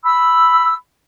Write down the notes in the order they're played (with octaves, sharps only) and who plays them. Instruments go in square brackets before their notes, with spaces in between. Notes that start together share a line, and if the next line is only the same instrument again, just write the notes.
[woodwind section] B5 E6